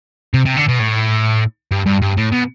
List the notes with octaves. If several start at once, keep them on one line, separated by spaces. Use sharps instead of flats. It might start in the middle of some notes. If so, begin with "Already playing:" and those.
C3
C3
D3
B2
A2
G2
G2
G2
A2
B2